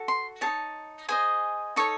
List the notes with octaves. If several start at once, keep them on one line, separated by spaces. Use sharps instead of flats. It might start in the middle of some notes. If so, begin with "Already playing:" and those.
Already playing: F#4 A4
C6
D#4 G#4 C#5 A5
G#4 C5 D#5 G#5
D#4 A4 C#5 C#6